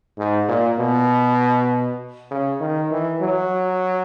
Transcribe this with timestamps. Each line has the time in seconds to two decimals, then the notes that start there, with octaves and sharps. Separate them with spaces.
0.18 G#2
0.48 A#2
0.79 B2
2.31 C#3
2.60 D#3
2.91 E3
3.21 F#3